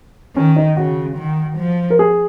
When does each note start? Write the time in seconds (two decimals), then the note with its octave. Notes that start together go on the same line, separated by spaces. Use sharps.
0.36 D#3 C#4
0.56 D#4
0.77 C#3 F#4
1.17 D#3
1.58 F3
1.90 A#4
1.99 G#4